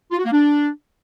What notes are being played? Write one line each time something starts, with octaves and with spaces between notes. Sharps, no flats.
F4
F#4
A#3
D4